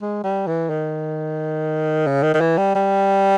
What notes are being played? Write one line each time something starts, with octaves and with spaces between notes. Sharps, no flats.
G#3
G3
E3
D#3
C#3
D#3
D#3
E3
G3
G3